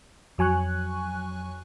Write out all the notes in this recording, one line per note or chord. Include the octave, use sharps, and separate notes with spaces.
F2 F#3 G#5 C#6 F#6